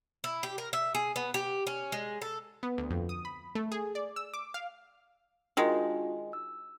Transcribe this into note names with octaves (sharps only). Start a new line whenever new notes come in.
E4
G4
A#4
E5
G#4
B3
G4
C#4
G#3
A4
B3
D2
F2
D#6
B5
A3
G#4
D5
E6
D6
F5
D#3 G#3 D4 F4 F#4
E6